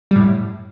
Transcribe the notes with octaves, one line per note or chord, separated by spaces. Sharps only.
F#2 A2 G3